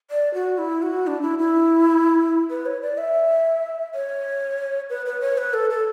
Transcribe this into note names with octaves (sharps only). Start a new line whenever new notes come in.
D5
F#4
E4
F#4
D4
E4
E4
B4
C#5
D5
E5
C#5
B4
B4
C#5
B4
A4
A4